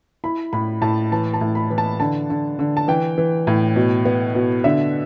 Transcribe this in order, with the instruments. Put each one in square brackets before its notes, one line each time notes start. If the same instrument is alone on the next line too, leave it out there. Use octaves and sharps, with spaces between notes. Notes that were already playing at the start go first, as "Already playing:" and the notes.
[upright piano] E4 B5
A2 B5
A2 A5
E3 A5
A5
A2
B5
E3
A5
D3 A5
D3
D3
A5
E3 G5
E3
A2
B2
B3
B2
D3 E5